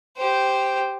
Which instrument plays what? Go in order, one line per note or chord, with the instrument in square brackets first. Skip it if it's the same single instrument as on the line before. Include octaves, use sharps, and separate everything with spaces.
[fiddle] G4 C5